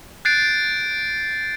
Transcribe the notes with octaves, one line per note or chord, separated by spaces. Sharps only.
F#6 G6 A6 C7 D7